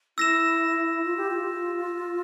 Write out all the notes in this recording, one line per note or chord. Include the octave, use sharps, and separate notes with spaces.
E4 E6 A#6 E7
F4
G4
F4